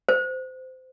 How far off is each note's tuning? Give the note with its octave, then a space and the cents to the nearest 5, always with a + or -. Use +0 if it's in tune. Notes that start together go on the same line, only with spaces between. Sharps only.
C5 -20